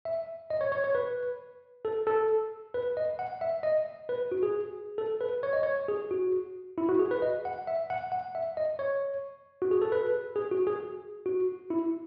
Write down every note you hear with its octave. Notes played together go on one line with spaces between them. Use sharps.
E5
D#5
C#5
C#5
C#5
B4
A4
A4
B4
D#5
F#5
E5
D#5
B4
F#4
G#4
A4
B4
C#5
D#5
C#5
G#4
F#4
E4
F#4
G#4
B4
D#5
F#5
E5
F#5
F#5
E5
D#5
C#5
F#4
G#4
A4
B4
G#4
F#4
G#4
F#4
E4